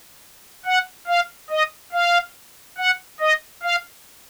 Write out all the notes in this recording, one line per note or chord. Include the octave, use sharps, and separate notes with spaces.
F#5
F5
D#5
F5
F#5
D#5
F5